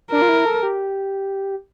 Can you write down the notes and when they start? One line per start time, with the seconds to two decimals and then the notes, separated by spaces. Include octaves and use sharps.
0.12 D4 A#4
0.22 F4
0.29 E4
0.45 A4
0.63 G4